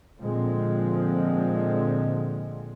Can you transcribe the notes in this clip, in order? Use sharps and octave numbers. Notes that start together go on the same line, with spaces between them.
A#2 D3 F3 G#3 C4